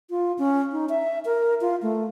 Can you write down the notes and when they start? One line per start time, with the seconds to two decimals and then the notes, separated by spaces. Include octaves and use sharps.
0.10 F4
0.38 C#4
0.72 D#4
0.89 E5
1.25 A#4
1.61 F4
1.82 A3